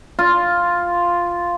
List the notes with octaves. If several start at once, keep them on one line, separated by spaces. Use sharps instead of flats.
F4